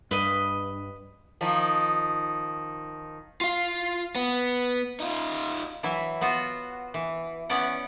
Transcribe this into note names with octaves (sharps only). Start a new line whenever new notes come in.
G2 B4 D#5
D#3 F3
F4 F5
B3
D#4 F4
E3 F#3 E4
B3 F4 F#4
E3
B3 C#4 D5 F#5